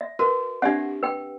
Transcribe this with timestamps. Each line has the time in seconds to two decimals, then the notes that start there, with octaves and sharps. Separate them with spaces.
0.01 E5
0.19 F#4 A#4 B4
0.62 C4 D4 G4 E5 F#5
1.03 B4 G5